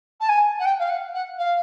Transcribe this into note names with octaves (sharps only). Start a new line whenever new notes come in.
A5
G#5
F#5
G5
F5
F#5
F#5
F5